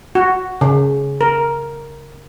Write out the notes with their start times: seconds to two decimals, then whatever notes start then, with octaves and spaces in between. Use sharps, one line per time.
0.15 F#4
0.61 C#3
1.21 A#4